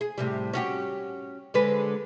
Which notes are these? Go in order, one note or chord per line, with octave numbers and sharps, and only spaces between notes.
G#4
A2 C3 G3
C#4 F#4 G4
D3 G#3 B4